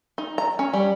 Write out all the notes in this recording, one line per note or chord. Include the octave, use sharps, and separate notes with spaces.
D#4
A#5
C#4
G3